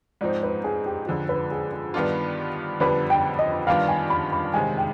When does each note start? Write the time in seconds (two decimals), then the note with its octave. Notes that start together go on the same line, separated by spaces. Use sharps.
0.21 G#2 F3 C4 D#4 D5
0.43 B4
0.64 G#4
0.86 G4
1.07 F2 D3 F3 G#4
1.29 B4
1.51 G#4
1.73 G#4
1.94 G2 D#3 B3 D4 F4
2.80 F2 D3 G3 B3 D4 B4
3.10 G5
3.39 D#5
3.67 G2 D#3 B3 D4 F4 F5
3.89 G#5
4.10 B5
4.32 B5
4.54 C3 D#3 G#3 G#5
4.78 G5